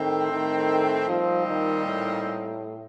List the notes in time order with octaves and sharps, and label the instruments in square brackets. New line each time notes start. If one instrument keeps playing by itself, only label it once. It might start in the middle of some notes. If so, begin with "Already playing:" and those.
Already playing: [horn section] A2 A3 C4 [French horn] D#3
[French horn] D#3
[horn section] A#2 G3 C4 D#4 [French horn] F3
[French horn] D#3
A2